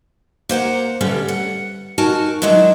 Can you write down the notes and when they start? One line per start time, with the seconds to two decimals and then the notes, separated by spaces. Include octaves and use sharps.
0.49 A#3 C5 F#5 A#5
1.01 D3 G3 A3 B3 C#4
1.28 F#5
1.98 D#4 F#4 A#4 G#5 A5
2.42 D#3 F#3 G#3 D4 E4